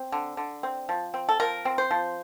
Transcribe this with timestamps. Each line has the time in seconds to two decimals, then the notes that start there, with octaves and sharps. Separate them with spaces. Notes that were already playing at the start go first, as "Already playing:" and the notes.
Already playing: C4
0.12 D3
0.37 D3
0.63 C4
0.89 F3
1.14 C4
1.29 A4
1.40 F3 A#4
1.65 C4
1.78 C5
1.91 F3